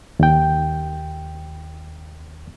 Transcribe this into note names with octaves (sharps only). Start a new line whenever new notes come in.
D#2 G5